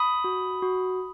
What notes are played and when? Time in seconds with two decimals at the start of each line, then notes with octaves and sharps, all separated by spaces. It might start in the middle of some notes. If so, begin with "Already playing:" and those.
Already playing: B5 D#6
0.24 F#4
0.62 F#4